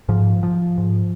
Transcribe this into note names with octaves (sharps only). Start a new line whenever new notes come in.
G#2 F3
F3
G#2